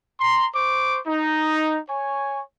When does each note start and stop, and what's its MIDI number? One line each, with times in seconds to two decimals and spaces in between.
0.19 0.46 82
0.19 0.46 84
0.54 0.99 72
0.54 0.99 85
0.54 0.99 86
1.07 1.77 63
1.88 2.41 73
1.88 2.41 80
1.88 2.41 85